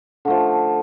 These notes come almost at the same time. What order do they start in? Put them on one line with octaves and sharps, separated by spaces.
D3 A3 F3